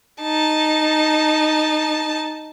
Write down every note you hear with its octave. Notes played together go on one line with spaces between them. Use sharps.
D#4 A5